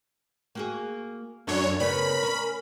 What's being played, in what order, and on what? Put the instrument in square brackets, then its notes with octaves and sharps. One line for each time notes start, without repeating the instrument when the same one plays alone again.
[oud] A#3 F#4 G#4
[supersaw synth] F#2 C#5 [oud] D4 A4
[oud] C#3 B3 C#4 [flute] A#4 [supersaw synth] B5
[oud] C#4